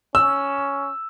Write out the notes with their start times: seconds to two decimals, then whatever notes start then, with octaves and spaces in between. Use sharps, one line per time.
0.15 C#4 E6